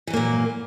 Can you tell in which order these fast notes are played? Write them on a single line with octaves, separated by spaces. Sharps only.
E3 F#3 A#3 A#2